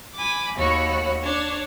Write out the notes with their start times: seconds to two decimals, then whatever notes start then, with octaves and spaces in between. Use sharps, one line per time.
0.15 G#5 B5 D6
0.57 D#2 F#4 C#5 B5
1.21 D4 C#5